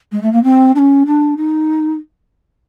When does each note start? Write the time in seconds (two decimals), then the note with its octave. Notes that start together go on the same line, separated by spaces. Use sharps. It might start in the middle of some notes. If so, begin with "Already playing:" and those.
0.12 G#3
0.23 A3
0.32 A#3
0.43 C4
0.75 D4
0.79 C#4
1.06 D4
1.37 D#4